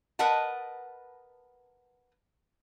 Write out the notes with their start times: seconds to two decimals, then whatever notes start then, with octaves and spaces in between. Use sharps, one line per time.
0.19 A#4 B4 D#5 F#5 A5